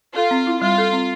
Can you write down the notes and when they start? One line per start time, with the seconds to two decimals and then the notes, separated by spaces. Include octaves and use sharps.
0.16 F4 A4
0.31 C4
0.47 E4
0.62 G3 F4
0.78 A4
0.93 C4